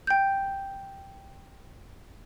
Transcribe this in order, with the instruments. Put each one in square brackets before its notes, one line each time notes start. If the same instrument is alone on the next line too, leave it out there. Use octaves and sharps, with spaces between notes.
[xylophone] G5 G6